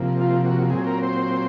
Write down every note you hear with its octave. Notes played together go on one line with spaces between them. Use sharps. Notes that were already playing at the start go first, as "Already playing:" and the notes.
Already playing: C3 F3 A#3
F4
F#4
A#2 F#3 C4 G#4
A#4
C5